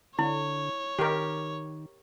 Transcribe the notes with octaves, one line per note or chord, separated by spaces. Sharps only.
D3 E4 C#5
D#3 G4 A#4